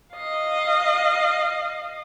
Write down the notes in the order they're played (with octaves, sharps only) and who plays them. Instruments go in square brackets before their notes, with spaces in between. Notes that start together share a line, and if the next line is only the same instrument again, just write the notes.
[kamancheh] D#5 F5